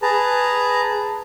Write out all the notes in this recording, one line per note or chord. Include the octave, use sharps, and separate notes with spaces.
G#4 B4 A5 A#5